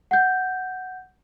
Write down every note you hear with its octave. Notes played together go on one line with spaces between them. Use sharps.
F#5 G6